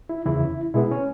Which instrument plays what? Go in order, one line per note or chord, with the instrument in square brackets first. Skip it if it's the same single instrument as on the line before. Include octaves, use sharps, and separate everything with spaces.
[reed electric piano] E4
E2 C#3 E3 E4
B2 G#3 B3 E4
C#4